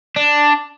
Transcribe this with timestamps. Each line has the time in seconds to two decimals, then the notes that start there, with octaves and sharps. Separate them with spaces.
0.16 D4